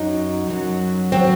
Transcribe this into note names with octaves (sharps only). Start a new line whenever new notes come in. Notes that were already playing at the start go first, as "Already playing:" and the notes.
Already playing: F#2 F#3 D#4
F#2 F#3
F#3 C4